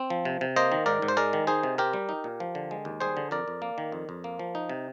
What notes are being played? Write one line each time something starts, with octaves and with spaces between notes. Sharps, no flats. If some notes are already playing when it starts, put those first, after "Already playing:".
Already playing: C4
F3
C3
C3
A#3 C5 D#5
D#3
G#2 A#4 D5
G#2
C5
G#3 A#4 D5
D#3
D#4 G#4 C5
C3
C4 G4 A#4
G3
D#4
A#2
F3
D3
G#3
D#2
G3 G#4 C5
D3
F2 A#4 D5
F2
A#3
D#3
F2
F2
A#3
F3
D#4
C3